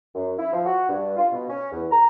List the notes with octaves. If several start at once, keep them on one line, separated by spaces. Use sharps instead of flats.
F#2
E4
F3
F#4
G2
F4
B2
C#4
E2
A#5